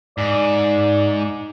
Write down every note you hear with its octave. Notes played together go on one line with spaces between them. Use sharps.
G#2 D5